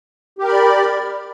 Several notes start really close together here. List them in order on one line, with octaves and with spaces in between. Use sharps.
G4 A#4 B5 D5